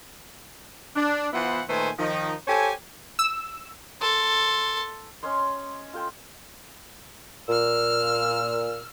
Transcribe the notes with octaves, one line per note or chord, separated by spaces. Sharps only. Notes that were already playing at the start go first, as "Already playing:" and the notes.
D4
E3 B3 E4 F4 C5 F#5
A#2 D#3 A3 B4 C5 G#5
D#3 F3 D#4
G4 A4 C5 C#5 G#5
E6
A4 C6
C#4 C#5 D#5 C6
F4 A4 G5
A#2 E6 F6